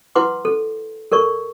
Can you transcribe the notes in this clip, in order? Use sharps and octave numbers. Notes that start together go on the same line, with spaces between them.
E4 B4 F#5 C6 D6
A4
A4 A#4 D5 C#6